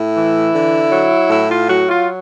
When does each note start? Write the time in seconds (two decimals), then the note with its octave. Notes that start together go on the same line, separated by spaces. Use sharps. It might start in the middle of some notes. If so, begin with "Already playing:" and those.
Already playing: A2 E4
0.16 E3
0.54 D3
0.92 F#3
1.30 A2 E4
1.50 F4
1.68 F#3 F#4
1.88 F4